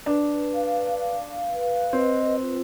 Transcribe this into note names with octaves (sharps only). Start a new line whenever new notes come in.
D4 B4
F5
F5
B4
C4 D#5
F4